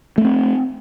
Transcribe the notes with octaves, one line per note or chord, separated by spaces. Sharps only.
A3 B3 C4